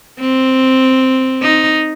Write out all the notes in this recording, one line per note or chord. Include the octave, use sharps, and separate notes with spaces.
C4
D#4